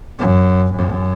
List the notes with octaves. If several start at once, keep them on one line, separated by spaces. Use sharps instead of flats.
F#2
F#2